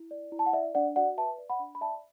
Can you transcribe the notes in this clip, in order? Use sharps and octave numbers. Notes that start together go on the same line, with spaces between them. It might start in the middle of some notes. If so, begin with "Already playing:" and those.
Already playing: E4
D5
E4
A5
F#5
D5 E5
D4 D5 F#5
F#4 D5 F#5
B4 E5 A5
D5
F#5 B5
D4
B5
D5 E5 A5